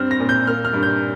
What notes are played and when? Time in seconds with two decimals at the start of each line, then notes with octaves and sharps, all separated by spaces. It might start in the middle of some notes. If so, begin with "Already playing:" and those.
Already playing: G2 C4 F6
0.11 A#6
0.20 A#2
0.29 G6
0.47 A#3 F6
0.65 F6
0.73 G2
0.83 G6